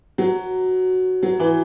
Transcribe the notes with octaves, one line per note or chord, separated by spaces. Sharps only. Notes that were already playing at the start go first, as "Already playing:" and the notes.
F#3
F#3
E3